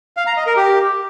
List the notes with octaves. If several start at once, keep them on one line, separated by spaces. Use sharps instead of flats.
F5
A#5
D#5
A#4
G4